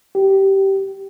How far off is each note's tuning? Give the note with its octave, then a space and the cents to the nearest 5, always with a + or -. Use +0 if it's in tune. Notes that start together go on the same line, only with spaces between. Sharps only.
G4 -15